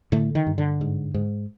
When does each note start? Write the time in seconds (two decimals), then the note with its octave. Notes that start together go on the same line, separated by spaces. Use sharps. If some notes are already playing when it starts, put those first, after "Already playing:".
0.12 A2 D3 A3
0.35 D#3
0.47 G2
0.58 D3
0.81 G#2
1.14 G#2